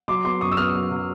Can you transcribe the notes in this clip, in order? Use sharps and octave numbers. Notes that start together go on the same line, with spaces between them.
F#3 C6 D6
B3 C6 D6
F#2 C#6 D#6
E6
B3 D#6 F6
F#3
F#3